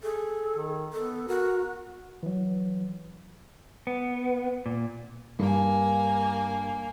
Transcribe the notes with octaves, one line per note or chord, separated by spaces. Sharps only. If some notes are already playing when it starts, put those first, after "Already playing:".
G#4 A4
D#3
B3 A4
F#4 A#4
E3 F#3
B3
A#2
G2 A#3 G#5